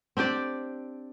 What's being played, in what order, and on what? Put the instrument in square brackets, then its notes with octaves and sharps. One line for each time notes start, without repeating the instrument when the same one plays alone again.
[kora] C4 D4 G4 D5